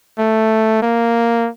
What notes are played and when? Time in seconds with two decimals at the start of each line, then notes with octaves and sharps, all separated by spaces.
0.18 A3
0.82 A#3